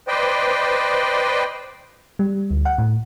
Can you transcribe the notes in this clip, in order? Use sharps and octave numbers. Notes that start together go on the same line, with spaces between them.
B4 C5 D5 D#5 G5
G3
D2
F#5
A2